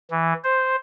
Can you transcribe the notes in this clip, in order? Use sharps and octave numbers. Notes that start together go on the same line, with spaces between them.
E3
C5